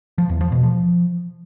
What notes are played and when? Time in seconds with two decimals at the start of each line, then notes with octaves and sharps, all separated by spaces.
0.18 F3
0.29 E2
0.41 F3
0.52 B2
0.63 F3